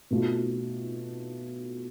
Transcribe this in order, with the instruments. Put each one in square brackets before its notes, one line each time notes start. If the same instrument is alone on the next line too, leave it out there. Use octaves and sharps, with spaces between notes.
[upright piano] B2 A3 F4